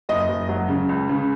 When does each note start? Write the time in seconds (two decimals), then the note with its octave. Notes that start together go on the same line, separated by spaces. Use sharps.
0.09 F#1 D#5
0.29 F#1
0.49 F#3
0.68 C#3
0.89 C#2
1.09 C#3